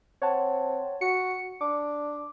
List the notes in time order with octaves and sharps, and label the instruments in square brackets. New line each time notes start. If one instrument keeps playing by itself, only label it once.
[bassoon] C4 [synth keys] C#5 F#5 A5
[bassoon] F#4 [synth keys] C#7
[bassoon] D4 [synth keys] D6